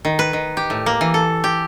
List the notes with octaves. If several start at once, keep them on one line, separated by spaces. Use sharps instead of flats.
D#3
B4
D#3
G4
A2
A#3
E3
A4
G4